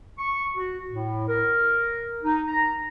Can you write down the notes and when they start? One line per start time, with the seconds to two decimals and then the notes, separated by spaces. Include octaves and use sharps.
0.18 C#6
0.57 F#4
0.90 A2
1.28 A#4
2.23 D#4
2.48 A#5